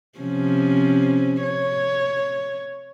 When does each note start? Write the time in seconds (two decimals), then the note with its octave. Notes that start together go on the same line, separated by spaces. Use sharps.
0.19 C3 F3 C#4
1.43 C#5